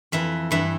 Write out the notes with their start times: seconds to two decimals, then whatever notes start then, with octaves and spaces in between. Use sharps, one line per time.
0.12 F2 E3 E5
0.51 G2 E3 E5